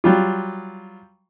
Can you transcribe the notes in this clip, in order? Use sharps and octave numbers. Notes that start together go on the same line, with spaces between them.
F#3 G3 F4